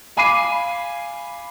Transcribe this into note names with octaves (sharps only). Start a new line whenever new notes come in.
F5 G#5 B5 D6 C7 D#7